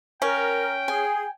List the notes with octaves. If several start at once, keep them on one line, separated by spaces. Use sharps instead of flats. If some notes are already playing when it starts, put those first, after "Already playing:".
C#4 A#4 G5
G#4 G#5